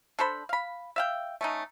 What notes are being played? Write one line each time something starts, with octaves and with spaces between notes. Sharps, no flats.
D4 A4 C5 B5
F5 B5
E5 F5 G5
A3 C#4 D#4